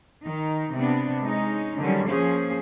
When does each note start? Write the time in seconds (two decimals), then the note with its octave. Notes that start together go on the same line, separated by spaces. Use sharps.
0.25 D#3 D#4
0.76 C3 B3 D4
1.24 G#3 C#4 D#4
1.80 D3 D#3 F#3 G3 C#4
2.09 F3 A#3 C#4 G#4 C5